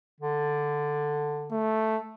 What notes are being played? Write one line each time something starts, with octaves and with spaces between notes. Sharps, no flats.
D3
A3